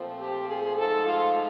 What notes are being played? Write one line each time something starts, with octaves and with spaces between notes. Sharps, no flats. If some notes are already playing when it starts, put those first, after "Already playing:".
Already playing: A#2 F3 A3 C4
G4
G#4
G#2 F3 A3 A4
F4